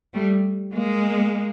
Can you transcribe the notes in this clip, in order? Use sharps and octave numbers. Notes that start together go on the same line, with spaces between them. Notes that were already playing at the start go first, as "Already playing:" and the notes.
G3 A3
G#3 A#3